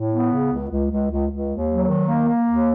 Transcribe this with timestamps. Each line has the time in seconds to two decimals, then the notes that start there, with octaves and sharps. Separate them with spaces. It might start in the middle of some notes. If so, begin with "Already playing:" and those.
Already playing: A2
0.12 B3
0.31 C#3
0.51 C#2
0.70 C#2
0.91 C#2
1.10 C#2
1.30 C#2
1.49 D#2
1.69 F#3
1.88 D#3
2.07 A#3
2.28 A#3
2.47 D#2